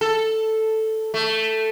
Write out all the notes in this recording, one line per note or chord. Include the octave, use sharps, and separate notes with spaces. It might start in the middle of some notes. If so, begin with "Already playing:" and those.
A4
A3